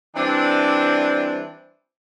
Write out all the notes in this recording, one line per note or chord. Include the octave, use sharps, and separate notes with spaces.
E3 G3 C4 D4